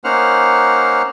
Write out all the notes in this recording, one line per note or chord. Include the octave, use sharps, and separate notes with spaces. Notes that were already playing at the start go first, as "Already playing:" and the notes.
A#3 C#4 D#4 C5 F#5 F6